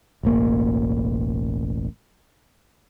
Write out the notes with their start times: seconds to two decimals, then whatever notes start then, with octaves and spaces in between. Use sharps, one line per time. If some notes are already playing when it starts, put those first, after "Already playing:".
0.23 E1 A1 A#3